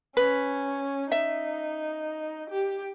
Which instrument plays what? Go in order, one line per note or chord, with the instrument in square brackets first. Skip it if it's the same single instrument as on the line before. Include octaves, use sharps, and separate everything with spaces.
[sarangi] C#4 [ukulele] B4
[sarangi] D#4 [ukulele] E5
[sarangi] G4